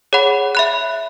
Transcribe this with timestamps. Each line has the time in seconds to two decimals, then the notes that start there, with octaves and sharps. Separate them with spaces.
0.13 G#4 C#5 F#5 B5
0.55 E5 B5 F#6